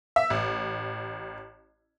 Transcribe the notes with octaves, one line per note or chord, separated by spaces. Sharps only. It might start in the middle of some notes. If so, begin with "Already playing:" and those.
E5
A1